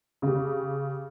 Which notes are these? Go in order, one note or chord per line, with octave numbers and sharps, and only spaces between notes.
C#3 G4